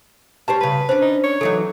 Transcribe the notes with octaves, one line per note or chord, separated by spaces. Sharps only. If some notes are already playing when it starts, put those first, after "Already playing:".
C#4 G4 C5 A5
G2 C#3 B4
C#4 D4 C5
D#4
C#5
E3 F#3 D#4 A4